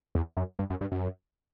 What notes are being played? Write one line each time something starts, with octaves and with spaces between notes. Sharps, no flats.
E2
F#2
G2
F#2
G2
F#2